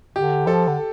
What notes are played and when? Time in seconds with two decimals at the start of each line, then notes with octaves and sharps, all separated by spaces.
0.16 D3 G4
0.46 F3 A4
0.68 D3